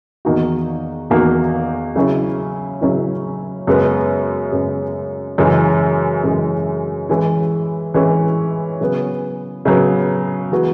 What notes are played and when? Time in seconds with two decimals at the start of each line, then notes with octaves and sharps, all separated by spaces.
0.25 E2 D#3 A#3 D#4 F#4
1.10 E2 D#3 A#3 D#4 F#4
1.96 C#3 F#3 C#4 E4
2.81 C#3 F#3 C#4 E4
3.67 F#2 C#3 G#3 B3
4.52 F#2 C#3 G#3 B3
5.38 F#2 C#3 E3 G#3
6.24 F#2 C#3 E3 G#3
7.09 E3 G#3 C#4 E4
7.94 E3 G#3 C#4 E4
8.81 C#3 F#3 B3
9.65 C#3 F#3 B3
10.52 E3 G#3 B3 F#4